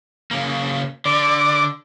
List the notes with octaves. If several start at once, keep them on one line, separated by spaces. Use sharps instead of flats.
C#3 A#3
D3 D5